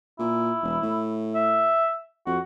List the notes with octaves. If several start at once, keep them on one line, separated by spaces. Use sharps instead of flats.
A#2 E4
E1
A2
E5
F2 F#4